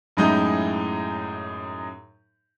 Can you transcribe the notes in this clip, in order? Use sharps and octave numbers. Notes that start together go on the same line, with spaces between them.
F#2 A2 G#3 D#4 E4 G6